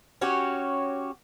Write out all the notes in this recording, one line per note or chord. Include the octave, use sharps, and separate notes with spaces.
C#4 F#4 G4 C#5